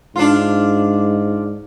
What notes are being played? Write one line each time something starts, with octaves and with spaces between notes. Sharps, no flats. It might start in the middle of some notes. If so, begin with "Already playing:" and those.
G#2 D4 F4